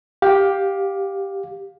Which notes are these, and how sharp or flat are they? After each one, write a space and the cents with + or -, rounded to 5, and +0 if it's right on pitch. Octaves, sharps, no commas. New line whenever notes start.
G4 +0 F5 +20